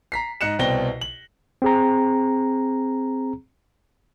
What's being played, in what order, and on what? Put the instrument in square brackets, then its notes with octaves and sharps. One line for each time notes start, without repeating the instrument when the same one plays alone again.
[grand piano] A#5 B6 C7
G#2 D#5 F#6 C#7 E7
C2 B2 C5 G5 A#6 G7
F#7
[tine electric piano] C4 G#4 A#5